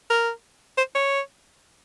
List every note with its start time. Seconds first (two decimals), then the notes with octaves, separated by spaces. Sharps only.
0.10 A#4
0.78 C5
0.95 C#5